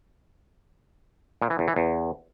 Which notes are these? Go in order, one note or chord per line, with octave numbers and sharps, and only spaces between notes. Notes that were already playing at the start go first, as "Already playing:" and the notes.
A#2
E3
E2
E3
E2